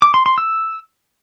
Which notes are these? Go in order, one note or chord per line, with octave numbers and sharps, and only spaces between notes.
D6
C6
C6
E6